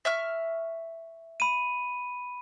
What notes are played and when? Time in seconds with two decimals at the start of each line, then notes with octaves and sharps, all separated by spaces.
0.05 E5 C#6 F6
1.40 B5 D#7